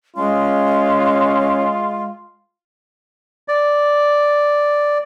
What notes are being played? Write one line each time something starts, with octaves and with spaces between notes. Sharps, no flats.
G#3 C#4 F4
D5